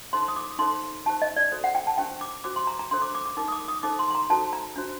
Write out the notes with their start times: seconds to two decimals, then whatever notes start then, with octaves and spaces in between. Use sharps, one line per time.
0.13 D#4 A4 C5 C6
0.28 D#6
0.36 D6
0.59 D#4 A4 C5 C6
1.06 D#4 G4 C5 A5
1.22 D#5
1.36 D5
1.52 F#4 A4 C5
1.64 F#5
1.75 G5
1.87 A5
1.98 D4 G4 C5 G5
2.21 D6
2.44 F#4 C5 D6
2.56 C6
2.67 A#5
2.79 A#5
2.91 D4 A4 C5 C6
3.02 D6
3.15 D6
3.26 D6
3.37 D#4 G4 A#4 D6
3.48 D#6
3.52 D6
3.68 D#6
3.83 D#4 A4 C5 D6
3.99 C6
4.10 C6
4.15 A#5
4.30 D#4 F#4 A4 C5 A5
4.53 A#5
4.76 D4 F#4 C5